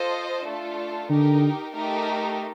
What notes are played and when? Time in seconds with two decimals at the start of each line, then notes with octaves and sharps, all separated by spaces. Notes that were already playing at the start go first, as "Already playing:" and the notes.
Already playing: F4 A4 C5 D#5
0.45 A3 D4 F4 A4
1.10 D3 D#4 G4 A#4
1.75 A3 D#4 G4 A#4